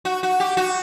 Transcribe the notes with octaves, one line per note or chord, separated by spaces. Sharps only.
F#4
F#4
G4
F#4